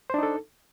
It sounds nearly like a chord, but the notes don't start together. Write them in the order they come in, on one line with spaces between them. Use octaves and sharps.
C5 D4 D#4 A4